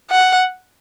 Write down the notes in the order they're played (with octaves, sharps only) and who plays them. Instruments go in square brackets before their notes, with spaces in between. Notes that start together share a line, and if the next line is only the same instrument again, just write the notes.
[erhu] F#5